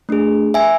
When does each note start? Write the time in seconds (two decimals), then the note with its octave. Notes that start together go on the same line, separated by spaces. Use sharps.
0.09 A3 D4 G#4
0.54 E5 G#5